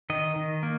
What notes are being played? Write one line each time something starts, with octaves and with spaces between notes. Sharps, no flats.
D#3 D#5
D#3
A#3